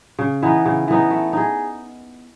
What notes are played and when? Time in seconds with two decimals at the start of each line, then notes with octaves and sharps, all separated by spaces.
0.19 C#3
0.42 E3 B3 D#4
0.65 C#3
0.88 E3 B3 D#4
1.11 A3
1.33 D#4 G#4